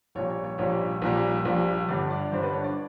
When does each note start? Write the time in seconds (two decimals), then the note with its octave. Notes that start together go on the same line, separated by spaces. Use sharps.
0.15 A#1 A#2 G3 C#5
0.30 C#5
0.44 C#5
0.58 A#1 A#2 G3 C#5
1.02 A#1 A#2 G3
1.45 A#1 A#2 G3
1.88 G1 G2 D3 D5
2.10 D5
2.32 G1 G2 D3 C5
2.43 B4
2.53 C#5
2.64 D5